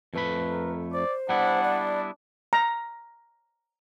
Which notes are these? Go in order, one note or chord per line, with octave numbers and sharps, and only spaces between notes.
F2 A3 B4 B5
A#4
C5 D5
G3 B3 D4 E4 F#5
D5
A#5